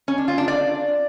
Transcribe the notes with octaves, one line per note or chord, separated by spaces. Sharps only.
C#4
D4
F4
D4
D5